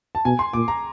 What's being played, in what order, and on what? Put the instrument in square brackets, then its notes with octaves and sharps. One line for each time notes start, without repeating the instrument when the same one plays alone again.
[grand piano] A5
[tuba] B2 [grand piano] G#5
[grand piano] C6
[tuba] A#2 [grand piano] D6
[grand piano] A#5